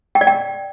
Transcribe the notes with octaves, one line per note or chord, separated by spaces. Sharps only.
G5
D5
G5